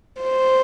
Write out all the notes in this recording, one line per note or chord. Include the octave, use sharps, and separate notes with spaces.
C5